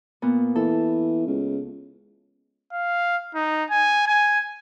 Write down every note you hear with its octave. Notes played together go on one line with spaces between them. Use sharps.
A#2 B3
E3 A4
C#2
F5
D#4
G#5
G#5